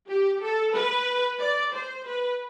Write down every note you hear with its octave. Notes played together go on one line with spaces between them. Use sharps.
G4
A4
B4
D5
C5
B4